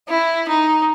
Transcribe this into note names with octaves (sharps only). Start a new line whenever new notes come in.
E4
D#4